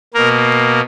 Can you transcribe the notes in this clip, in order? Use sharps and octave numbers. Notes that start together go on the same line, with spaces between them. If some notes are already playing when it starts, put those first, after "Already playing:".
B2 A#3 A#4